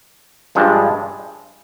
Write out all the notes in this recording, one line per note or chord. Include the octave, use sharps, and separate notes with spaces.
G2 F3 G#3 D4